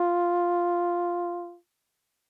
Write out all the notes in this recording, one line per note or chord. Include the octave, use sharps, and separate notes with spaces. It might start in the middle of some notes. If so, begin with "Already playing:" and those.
Already playing: F4